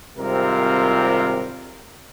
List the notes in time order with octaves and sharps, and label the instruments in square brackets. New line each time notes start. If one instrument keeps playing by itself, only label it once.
[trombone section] G#1 C3 G3 C4 F4 A#4